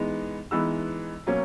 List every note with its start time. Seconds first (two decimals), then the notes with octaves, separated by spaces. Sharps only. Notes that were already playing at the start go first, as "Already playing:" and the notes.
Already playing: E3 G#3 B3 D#4
0.51 E3 G#3 B3 D#4 E6
1.26 B2 F#3 A#3 C#4